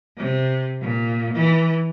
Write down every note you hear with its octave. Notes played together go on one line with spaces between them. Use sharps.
C3
A#2
E3